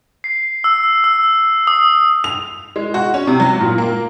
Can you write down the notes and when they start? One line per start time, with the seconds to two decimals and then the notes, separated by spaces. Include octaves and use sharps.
0.24 C7
0.64 E6
1.04 E6
1.67 D#6
2.24 F7
2.76 G#3
2.94 F#4
3.14 C#4
3.27 C3
3.40 F#3
3.61 A#2
3.78 A#3